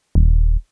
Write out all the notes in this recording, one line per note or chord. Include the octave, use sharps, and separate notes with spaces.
D#1